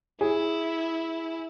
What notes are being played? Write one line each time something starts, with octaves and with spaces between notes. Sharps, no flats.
E4 G#4